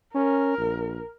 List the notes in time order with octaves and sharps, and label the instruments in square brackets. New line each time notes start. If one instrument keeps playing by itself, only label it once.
[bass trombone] C#4 [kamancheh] A#4
[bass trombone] A#1